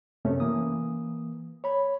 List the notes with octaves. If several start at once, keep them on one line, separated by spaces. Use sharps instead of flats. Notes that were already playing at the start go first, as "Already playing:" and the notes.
F#2 C3 A3 B3 C#4
E3 A#3 D#6
C#5 B5